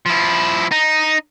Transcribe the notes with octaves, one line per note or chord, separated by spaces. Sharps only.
F3 E4
D#4